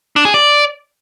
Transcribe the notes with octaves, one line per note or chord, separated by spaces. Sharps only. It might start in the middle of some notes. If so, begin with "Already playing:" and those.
D4
G#4
D5